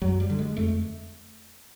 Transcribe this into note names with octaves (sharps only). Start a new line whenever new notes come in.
F#2 F#3
G3
D3
G#3
F2 A3